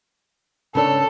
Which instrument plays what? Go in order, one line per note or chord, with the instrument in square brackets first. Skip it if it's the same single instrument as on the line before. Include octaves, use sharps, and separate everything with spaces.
[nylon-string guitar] C#3 D4 C#5 [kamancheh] A4